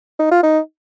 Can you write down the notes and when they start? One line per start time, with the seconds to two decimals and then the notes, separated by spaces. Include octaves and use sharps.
0.19 D#4
0.31 F4
0.43 D#4